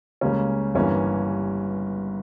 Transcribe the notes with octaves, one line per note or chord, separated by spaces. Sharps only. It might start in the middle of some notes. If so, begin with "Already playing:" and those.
C#2 C#3 G3 A#3 C#4
G1 G2 E3 G3 A#3 C#4